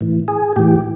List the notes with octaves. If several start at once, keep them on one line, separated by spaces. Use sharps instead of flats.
A2 E3
G#4
A2 E3 G4